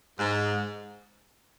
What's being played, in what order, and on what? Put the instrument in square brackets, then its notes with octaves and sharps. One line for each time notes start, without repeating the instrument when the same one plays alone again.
[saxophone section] G#2